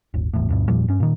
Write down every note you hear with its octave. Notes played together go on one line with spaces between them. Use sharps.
D#1 G#1
G#1 E2 A2
D2 G2 B2
E2 A#2 F3 G3
G2 C#4
A#2 D#3